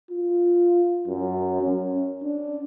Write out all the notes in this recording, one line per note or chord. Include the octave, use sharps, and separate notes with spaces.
F4
F#2
C#4
D4